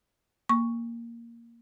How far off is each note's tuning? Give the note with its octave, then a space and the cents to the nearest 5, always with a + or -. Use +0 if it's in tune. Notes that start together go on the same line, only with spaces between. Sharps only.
A#3 +0 C#6 +0